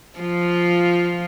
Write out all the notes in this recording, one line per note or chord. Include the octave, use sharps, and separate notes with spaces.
F3 F4